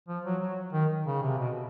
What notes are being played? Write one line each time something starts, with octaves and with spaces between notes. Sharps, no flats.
F3
F#3
F#3
D#3
C#3
C3
B2